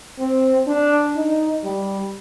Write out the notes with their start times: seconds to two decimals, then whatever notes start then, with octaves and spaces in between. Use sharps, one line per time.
0.19 C4
0.68 D4
1.17 D#4
1.64 G3